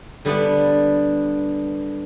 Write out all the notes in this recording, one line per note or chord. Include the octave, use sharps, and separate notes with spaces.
D3 G3 B3 D4